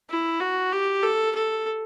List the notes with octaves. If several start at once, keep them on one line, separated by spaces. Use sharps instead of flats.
E4
F#4
G4
A4
A4